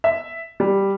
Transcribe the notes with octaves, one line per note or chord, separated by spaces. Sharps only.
E5
G3